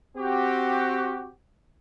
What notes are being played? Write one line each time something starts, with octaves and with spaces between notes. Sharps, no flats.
C4 F#4 G4